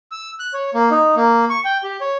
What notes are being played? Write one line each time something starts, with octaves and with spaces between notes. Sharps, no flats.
E6
F#6
C#5
A#3
D#4
A#3
C#6
G5
G4
C#5